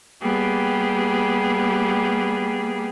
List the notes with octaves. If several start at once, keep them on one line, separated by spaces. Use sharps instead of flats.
G3 A#3 B3 G4 G#4